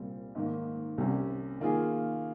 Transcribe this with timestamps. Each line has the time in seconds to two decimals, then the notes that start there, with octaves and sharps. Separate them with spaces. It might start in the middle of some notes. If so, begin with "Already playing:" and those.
Already playing: C2 A#2 G3 C4
0.35 G#2 D#3 A#3
0.98 C2 C3 G3 C#4
1.60 D#3 A#3 F4 G#4